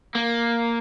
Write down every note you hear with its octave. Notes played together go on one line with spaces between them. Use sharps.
A#3